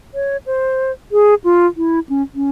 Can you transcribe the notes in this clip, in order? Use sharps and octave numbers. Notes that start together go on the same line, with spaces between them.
C#5
C5
G#4
F4
E4
C#4
C#4